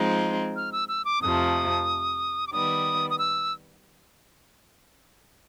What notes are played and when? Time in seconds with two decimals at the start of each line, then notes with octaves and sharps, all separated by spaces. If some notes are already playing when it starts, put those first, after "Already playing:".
Already playing: F3 G#3 C4 D#4
0.56 F6
0.72 E6
0.88 E6
1.05 D6
1.22 F2 C3 F3 A3 D#6
2.47 D6
2.52 D#3 G3 B3 D#6
3.10 D#6
3.19 E6